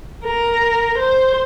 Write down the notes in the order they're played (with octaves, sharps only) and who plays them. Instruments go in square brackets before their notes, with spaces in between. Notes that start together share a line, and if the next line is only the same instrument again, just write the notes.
[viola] A#4
C5